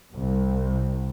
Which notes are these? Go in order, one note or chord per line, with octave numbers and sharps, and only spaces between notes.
C2